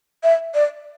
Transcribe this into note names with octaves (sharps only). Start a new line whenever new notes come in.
E5
D5